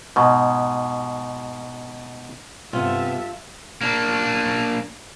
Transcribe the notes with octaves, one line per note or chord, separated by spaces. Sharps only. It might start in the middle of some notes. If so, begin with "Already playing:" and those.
G#2 B2
G2 C3 B3 F4 A4 E5
A#3 D4